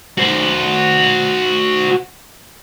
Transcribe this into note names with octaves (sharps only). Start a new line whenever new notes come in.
F#4 C5